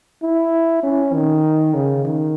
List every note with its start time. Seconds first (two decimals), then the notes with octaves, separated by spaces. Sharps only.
0.22 E4
0.83 C#4
1.14 D#3
1.74 C#3
2.05 D#3